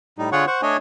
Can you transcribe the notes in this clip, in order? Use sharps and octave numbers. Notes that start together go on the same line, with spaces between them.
A2 G3 D#4
D3 F4 G#4 C#5 F#5 C#6
C5 F#5 C#6
A3 D4 C#5 D#5 G#5